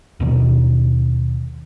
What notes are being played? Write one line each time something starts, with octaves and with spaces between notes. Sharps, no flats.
D#2 B2 D#3